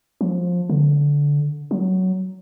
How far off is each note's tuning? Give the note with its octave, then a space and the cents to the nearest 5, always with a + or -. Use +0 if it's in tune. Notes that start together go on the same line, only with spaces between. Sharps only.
F3 +20
D3 -15
F#3 +10